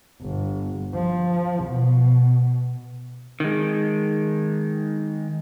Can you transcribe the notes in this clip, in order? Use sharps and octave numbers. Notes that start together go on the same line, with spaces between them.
G1
F3
B2
D#3 G#3